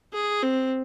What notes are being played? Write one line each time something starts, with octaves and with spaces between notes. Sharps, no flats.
G#4
C4